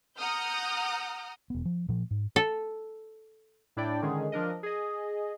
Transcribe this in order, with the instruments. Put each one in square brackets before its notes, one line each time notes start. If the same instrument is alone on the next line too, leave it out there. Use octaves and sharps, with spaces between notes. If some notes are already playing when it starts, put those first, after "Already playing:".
[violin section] F#5 A#5 D#6 F6 G6
[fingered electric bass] E1 B3
F3
A#2 F3
G#2
[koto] A4
[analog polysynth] A2 D4 E4 D5 G5
D3 D#3 G#3 C#4 G#4
F3 D4 A#4 D#5
G#4 D#5